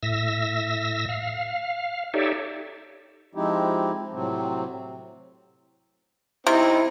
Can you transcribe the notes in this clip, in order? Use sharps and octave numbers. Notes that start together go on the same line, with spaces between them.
A2 E5 E6 A#6
F5
D#4 G4 A4 C#5 D5 E5
F3 G#3 C4 D#4 E4 G4
A2 C3 F#3 C4
C3 C4 D#4 E4